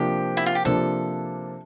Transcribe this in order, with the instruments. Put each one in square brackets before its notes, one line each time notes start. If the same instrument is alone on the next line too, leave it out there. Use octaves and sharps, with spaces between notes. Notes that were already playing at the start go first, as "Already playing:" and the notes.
Already playing: [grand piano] C3 F3 A#3 D4 [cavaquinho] G4
[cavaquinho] E4
F4
G4
[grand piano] C3 F3 A#3 D4 [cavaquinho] A4